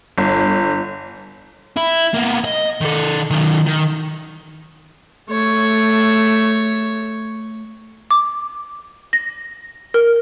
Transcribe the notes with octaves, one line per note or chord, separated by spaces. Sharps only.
G1
E4
A#3 B3
D#5
D#3 A4
D#3 F#3
D#3
A3 C#5
D6
A#6
A#4